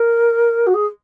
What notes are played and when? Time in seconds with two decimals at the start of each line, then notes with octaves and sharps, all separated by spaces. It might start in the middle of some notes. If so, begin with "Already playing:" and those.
Already playing: A#4
0.66 F#4
0.73 G#4